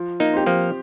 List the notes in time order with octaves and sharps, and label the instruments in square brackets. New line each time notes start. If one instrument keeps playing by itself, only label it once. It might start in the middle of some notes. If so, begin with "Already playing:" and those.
Already playing: [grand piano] F3
[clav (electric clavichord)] A#3 D#4
[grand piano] C4 G4
[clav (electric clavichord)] F3 A#3